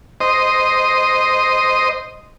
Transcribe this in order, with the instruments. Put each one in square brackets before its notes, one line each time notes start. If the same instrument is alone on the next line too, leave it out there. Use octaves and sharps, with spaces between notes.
[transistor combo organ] C5 D#5